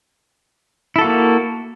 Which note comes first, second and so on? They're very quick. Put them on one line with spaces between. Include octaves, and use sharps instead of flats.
E4 A4 F#4 A#3